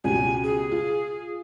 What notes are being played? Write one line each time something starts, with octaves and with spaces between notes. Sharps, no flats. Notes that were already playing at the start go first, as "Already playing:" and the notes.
C#2 B2 G4 G#5
G#4
F4